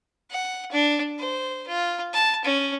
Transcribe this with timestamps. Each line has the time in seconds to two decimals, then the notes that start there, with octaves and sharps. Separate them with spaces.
0.31 F#5
0.71 D4
1.18 C5
1.67 F4
2.13 A5
2.44 C#4